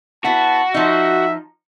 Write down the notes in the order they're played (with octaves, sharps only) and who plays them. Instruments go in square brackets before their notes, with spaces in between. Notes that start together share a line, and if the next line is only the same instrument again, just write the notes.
[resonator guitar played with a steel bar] B3 E4 [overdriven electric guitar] F#4 [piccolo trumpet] A5
[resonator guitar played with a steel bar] F3 D#4 [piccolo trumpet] E5